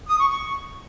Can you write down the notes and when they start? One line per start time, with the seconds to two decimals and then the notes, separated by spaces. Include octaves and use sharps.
0.07 D#6
0.18 C#6
0.28 C#6